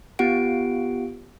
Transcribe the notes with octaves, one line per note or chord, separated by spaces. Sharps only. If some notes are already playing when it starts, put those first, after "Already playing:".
B3 F4 G4 F#5 D7